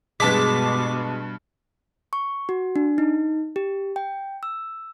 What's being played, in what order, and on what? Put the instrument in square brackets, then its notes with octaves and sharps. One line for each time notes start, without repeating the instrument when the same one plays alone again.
[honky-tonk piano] G2 A5 B6 [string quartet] B2 [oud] G#3 B3 [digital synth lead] D6
[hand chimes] C#6
F#4
D4
D#4
G4
G5
E6